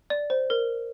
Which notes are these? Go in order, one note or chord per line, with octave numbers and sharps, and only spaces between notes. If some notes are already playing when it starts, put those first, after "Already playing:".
D5
C5
A#4